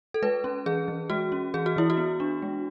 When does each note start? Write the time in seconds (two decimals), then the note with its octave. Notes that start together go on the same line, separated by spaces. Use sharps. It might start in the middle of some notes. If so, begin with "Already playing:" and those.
0.14 A4
0.22 G#3 B4
0.44 C#4
0.66 E3 G#4
0.88 E3
1.10 G#3 F#4
1.32 C#4
1.54 E3 G#4
1.66 F#4
1.76 E3 E4
1.90 F#4
1.97 B3
2.20 D4
2.42 G#3